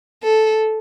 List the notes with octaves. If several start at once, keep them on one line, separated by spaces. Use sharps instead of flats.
A4